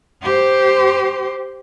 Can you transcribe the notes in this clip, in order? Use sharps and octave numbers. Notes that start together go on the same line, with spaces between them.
G4 C5